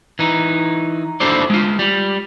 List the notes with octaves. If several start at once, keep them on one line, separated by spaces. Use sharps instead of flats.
E3 D#4
D4 E4 F#4 A4 C5 D5
G#3 F4
G3